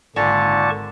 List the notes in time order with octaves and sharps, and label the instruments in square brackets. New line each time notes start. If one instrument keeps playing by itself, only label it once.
[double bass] G#1 [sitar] A#2 [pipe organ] D3 A5 C#6